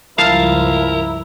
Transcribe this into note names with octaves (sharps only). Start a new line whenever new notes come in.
C#2 G2 F3 E4 A#4 F5 A5